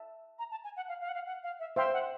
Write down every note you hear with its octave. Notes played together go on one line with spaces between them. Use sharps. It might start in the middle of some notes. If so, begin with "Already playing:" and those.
Already playing: E5 A5
A#5
A5
G#5
F#5
F5
F5
F#5
F5
F#5
F5
E5
C5 E5 F5 G5 C6
F#5